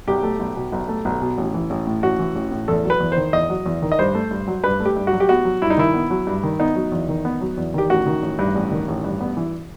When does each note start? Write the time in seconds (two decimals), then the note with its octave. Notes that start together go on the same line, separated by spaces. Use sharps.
0.08 B1 G4
0.23 A3
0.40 B1
0.56 B2
0.72 B1
0.89 A3
1.05 B1
1.22 B2
1.38 A1
1.54 E3
1.70 A1
1.87 A2
2.03 A1 F#4
2.19 E3
2.35 A1
2.51 A2
2.68 E2 A4
2.85 F#3
2.90 B4
3.00 E2
3.12 D#3 C5
3.33 E2 D#5
3.50 F#3
3.66 E2
3.82 D#3
3.92 D#5
3.99 G2 C5
4.15 A3
4.31 G2
4.48 F#3
4.64 G2 B4
4.80 A3
4.85 G4
4.97 G2
5.07 F#4
5.13 F#3
5.20 G4
5.29 B3 F#4
5.45 F#3
5.62 G2 E4
5.70 D#4
5.78 D#3 E4
5.94 B3
6.10 F#3
6.27 G2
6.43 D#3
6.59 B3 D#4
6.76 F#3
6.92 E2
7.08 D#3
7.25 B3
7.41 F#3
7.57 E2
7.74 D#3 G4
7.90 A1 F#4
8.06 D#3
8.22 A1
8.39 G2
8.55 A1
8.72 D#3
8.88 A1
9.04 G2
9.21 B3
9.37 E3